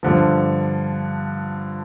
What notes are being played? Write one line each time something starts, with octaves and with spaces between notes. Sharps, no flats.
G2 D3 F3